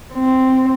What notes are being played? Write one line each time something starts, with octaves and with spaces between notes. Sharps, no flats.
C4